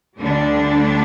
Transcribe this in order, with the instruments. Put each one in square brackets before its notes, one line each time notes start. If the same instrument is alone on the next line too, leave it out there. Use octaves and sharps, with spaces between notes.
[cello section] D2 D3 G3 D4